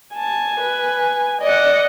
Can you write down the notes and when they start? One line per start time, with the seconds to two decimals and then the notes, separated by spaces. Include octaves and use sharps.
0.16 G#5 A5
0.60 B4
1.42 D5 D#5 F#5